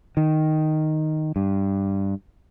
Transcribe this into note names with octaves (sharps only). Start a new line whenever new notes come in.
D#3
G2